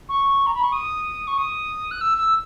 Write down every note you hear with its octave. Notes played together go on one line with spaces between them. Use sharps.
C#6
A#5
B5
C#6
D#6
C#6
D#6
F#6
E6
E6